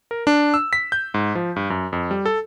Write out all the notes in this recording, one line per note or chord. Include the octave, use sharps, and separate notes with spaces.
A#4
D4
E6
B6
G6
G#2
F3
G2
F#2
F2
G3
A4